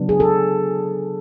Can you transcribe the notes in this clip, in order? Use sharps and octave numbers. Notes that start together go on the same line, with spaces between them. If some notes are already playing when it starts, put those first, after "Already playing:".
Already playing: C#3 F#3 B3 D4
G#4
A4